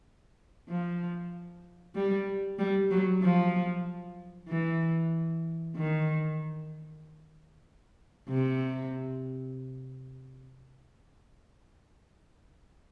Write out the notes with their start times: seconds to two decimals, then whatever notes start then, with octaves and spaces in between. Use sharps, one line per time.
0.69 F3
1.95 G3
2.59 G3
2.91 F#3
3.22 F3
4.49 E3
5.75 D#3
8.29 C3